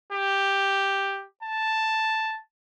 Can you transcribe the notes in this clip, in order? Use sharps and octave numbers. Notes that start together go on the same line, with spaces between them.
G4
A5